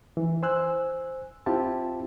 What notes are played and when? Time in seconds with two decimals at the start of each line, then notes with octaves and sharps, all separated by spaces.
0.17 E3
0.43 C5 G#5 E6 F#6
1.46 C4 E4 F4 G4 A5